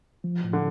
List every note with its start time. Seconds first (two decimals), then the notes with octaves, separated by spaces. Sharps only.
0.24 F3
0.44 A2
0.53 D3